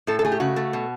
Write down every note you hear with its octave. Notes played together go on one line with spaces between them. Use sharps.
A2 A4
A4
A3 G#4
G4
C#3 F#4
A3
B2